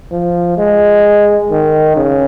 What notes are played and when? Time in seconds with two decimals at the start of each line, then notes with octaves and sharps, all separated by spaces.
0.12 F3
0.58 G#3
1.50 D#3
1.97 C#3